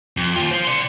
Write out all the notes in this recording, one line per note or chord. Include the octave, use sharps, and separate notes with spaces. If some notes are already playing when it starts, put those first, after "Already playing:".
F2
D#2 F4
C5 F5
D5 C6